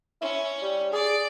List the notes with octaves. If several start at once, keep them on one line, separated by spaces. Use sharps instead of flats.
C#4 E4
G3
G#4 D5